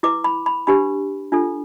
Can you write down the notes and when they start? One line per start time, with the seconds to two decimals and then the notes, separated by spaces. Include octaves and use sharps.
0.03 E4 B4 D6
0.24 B5
0.46 B5
0.67 D4 G4 B4 B5
1.32 D4 F4 A4